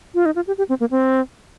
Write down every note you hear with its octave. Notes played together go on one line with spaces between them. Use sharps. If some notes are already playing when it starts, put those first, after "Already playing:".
F4
D#4
F4
G4
G4
C4
A#3
C4